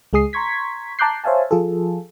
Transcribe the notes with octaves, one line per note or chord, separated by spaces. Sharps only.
C#2 G#3 G#4 D#6 C7
A#5 C6 C#6 G#6 B6
A5 A#5 D6 F#6 G6 C7
C5 C#5 E5 F5 G#5 A5
F3 F4 G#4 A4